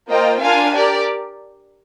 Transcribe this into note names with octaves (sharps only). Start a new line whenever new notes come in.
A#3 F4 C5 D#5 G5
D4 F4 A#4 F5 G#5
G4 A#4 D5